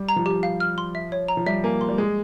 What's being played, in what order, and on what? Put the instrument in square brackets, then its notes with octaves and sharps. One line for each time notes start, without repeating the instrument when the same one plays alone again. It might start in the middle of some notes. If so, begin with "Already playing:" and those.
Already playing: [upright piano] G3
[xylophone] A#5
[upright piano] F3
[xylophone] G4
F5
F6
C6
E5
C#5
A#5
[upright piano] F3
[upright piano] G3 [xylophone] E5
[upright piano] A#3 [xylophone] G#5
[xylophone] C6
[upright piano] G3
[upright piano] G#3 [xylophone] C6